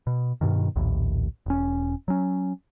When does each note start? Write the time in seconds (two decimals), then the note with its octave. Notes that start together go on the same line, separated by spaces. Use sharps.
0.07 B2
0.41 G2 B2 D#3
0.76 A#1 D#2 A2
1.46 E1 C#4
2.08 F#3 C#4